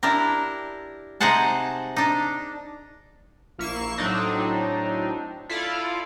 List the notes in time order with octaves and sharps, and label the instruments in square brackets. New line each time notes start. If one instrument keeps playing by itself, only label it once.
[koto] D4 E4 G4 A#4
C3 D#4 G#4 C5 F#5 A5
D4 D#4
[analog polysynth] A#1 A#3 E4 C#6 C7 E7
A2 F#3 C4 D4 D#4
E4 F4 A4 D5 F5